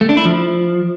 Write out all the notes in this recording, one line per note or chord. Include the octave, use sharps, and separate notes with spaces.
A3
D4
E4
F3